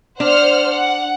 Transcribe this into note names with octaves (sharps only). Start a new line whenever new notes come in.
D4 C5 F#5 F6
F#5